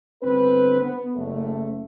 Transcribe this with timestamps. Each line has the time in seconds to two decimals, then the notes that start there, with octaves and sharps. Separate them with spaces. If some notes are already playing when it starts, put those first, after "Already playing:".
0.23 G1 D3 C4 B4
0.81 B3
1.15 F#1 A3